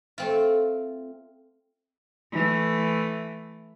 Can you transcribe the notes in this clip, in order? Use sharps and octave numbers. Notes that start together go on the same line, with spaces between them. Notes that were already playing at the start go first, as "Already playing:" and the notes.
A3 C4 F4
E3 A3